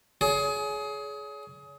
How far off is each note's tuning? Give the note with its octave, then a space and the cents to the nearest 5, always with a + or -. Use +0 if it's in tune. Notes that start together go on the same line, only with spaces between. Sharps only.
G#4 +25 C#5 +35